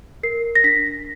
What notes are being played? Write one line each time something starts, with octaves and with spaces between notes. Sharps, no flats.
A#4 C7
A#6
D4 B6